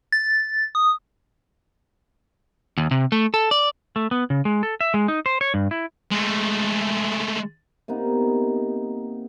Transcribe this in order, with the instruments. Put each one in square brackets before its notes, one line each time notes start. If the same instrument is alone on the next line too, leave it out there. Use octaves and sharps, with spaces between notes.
[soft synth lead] A6
D#6
[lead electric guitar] D#2
C3
A3
A4
D5
[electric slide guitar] A3
B3
C#3
G#3
A4
E5
G#3
D#4
C5
C#5
G2
E4
[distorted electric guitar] G#3 A3
[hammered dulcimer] C3 A#3 B3 D#4